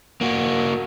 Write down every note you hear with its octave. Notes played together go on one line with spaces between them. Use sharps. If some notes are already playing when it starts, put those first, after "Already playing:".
A#3 F#4